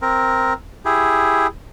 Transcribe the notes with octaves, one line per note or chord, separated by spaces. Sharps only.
C4 A#4
E4 G4 G#4